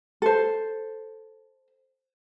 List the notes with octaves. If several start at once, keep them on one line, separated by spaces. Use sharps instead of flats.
A4 C5